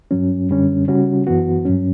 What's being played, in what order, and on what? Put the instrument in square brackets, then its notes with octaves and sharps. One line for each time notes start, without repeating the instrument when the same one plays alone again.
[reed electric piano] G2 F#3 C#4
F#2 D3 G3 C#4
C#3 G3 C#4 F#4
F#2 E3 B3 F#4
G2 F#3 C#4